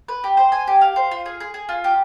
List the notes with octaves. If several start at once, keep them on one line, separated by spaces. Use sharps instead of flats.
B4
G4
C5
G#5
G4
F5
C5
F4
G#4
G#4
G#4
F4
G4